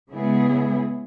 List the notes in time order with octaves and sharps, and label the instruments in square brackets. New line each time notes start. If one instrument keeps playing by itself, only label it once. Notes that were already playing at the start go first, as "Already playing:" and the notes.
[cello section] C#3 G#3 B3 E4 G#4